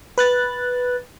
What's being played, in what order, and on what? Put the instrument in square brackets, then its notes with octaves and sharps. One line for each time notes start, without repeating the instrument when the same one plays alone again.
[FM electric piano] B4 F#6 A6